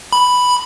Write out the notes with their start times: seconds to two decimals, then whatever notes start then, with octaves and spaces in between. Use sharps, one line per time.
0.13 B5